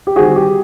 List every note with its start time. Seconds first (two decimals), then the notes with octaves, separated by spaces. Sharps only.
0.07 G4
0.16 D#3 G3 C4 F#4 G#4
0.36 G4